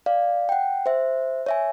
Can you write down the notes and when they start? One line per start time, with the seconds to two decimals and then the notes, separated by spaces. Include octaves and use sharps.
0.06 D5 F5
0.49 F#5 G5
0.86 C5 E5
1.46 C#5 E5 G#5